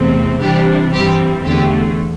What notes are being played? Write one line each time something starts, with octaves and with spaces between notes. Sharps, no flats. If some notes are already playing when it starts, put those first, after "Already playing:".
Already playing: E2 C3 A3 C4
C3 E3 G3 D4 G4
G2 E3 G3 C4 G4
E2 D3 A3 G4